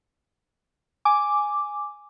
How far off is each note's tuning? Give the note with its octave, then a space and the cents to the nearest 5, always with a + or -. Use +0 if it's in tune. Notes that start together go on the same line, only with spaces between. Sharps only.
G#5 +0 D6 +0